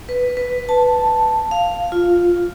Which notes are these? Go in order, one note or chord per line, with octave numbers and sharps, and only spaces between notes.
B4
B4
A5
F5
F4